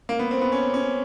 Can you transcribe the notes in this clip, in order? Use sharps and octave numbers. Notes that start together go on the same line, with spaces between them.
A#3
B3
C4
B3
C#4
C#4